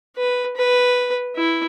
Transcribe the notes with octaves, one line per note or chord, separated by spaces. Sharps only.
B4
B4
E4